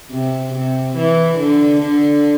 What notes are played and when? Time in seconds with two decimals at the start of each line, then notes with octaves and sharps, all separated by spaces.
0.11 C3
0.54 C3
0.96 E3
1.38 D3
1.81 D3